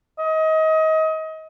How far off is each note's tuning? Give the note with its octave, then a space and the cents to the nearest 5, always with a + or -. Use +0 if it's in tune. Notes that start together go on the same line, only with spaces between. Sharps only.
D#5 +30